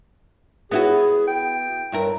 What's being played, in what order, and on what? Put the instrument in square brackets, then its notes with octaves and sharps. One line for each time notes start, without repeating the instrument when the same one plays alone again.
[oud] B3 E4 F#4 [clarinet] G#4
[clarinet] G5
[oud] G2 E4 A#4